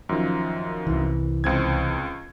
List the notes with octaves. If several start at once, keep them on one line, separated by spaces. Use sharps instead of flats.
F#2 D#3 F3
C2 E3
C#2 C4 G#6